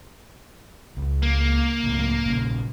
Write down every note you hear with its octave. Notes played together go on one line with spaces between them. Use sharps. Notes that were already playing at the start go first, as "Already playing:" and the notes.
C#2
A#3
C#2 A2
A#1 C#3